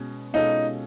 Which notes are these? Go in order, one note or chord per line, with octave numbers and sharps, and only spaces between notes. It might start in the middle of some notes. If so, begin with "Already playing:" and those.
Already playing: B2 G#3 C#4
B2 G#3 C#4 D#4 F4 A4